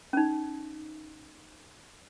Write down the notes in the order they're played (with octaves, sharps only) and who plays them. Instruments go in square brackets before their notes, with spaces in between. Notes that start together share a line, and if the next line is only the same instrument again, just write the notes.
[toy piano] C#4 D#4